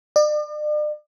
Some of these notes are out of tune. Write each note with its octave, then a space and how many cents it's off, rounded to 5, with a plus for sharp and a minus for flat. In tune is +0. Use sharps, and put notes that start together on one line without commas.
D5 +40